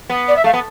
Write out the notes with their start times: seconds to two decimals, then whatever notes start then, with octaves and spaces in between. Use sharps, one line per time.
0.10 B3
0.28 D5
0.36 E5
0.44 A3 F5
0.53 B3